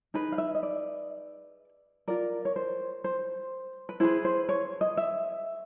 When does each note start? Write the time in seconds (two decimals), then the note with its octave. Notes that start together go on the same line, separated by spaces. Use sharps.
0.14 D#4 G#4 B4
0.32 F5
0.38 E5
0.55 D#5
0.63 D5
2.08 F4 A#4 D5
2.45 C#5
2.56 C5
3.04 C5
3.89 B4
4.00 E4 G#4 B4 C5
4.25 C5
4.49 C#5
4.81 D#5
4.97 E5